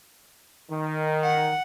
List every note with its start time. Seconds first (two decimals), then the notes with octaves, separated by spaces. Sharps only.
0.71 D#3
1.24 F#5